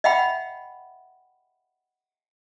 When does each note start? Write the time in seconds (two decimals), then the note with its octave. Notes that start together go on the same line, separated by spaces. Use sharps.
0.04 D#5 E5 F#5 G5 B5